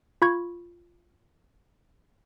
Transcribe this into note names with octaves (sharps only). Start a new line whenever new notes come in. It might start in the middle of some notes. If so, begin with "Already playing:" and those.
F4 B5 C#6 G#6